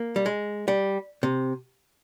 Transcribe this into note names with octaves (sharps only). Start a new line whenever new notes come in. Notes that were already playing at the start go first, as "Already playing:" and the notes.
Already playing: A#3
G3
G#3
G3
C3